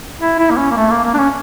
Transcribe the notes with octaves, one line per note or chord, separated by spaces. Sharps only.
E4
E4
A#3
C#4
A#3
A3
A#3
A#3
D4
C#4